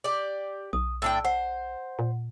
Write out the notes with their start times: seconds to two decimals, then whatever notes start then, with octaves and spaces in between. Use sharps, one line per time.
0.04 G4 D5
0.73 B1 D#6
1.02 A2 D4 G5 E6
1.25 C5 F#5
1.99 A#2